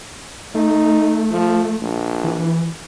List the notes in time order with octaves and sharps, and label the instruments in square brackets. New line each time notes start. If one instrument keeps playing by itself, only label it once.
[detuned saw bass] A3 [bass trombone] D#4
[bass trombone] F3
A#1
[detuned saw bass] E3